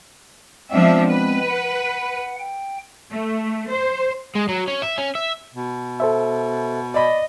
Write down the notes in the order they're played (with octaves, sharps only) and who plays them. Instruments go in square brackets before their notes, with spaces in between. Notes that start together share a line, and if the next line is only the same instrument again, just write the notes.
[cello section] F3 D4 E5 [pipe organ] G#3 B3 C4
[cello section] B4
[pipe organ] F#5
G5
[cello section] A3
C5
[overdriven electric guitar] G#3
F#3
C#4
E5
C#4
E5
[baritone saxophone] B2
[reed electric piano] A4 C5 E5
[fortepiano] D5 B5 [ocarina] D#5